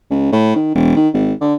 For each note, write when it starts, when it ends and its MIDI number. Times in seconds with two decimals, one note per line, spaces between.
0.11 0.28 37
0.32 0.55 45
0.56 0.72 51
0.75 0.96 28
0.96 1.09 51
1.14 1.33 32
1.41 1.54 50